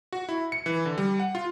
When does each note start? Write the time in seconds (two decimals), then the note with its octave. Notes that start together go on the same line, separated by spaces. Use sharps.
0.12 F#4
0.29 E4
0.52 C#7
0.66 E3
0.85 D3
0.98 G3
1.20 F#5
1.35 F4